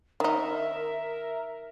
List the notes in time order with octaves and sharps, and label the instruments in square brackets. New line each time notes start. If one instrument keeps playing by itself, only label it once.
[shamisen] D#3 D#4 [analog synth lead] A#4 [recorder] E5